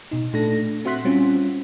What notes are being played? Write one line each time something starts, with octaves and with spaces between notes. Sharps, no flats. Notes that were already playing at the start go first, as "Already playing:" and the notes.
B2 D#4
A#2 A3 D4 A4 A#6
C4 F#4 E5 C6 F#6 B6
G3 C4 C#4 F4 F#4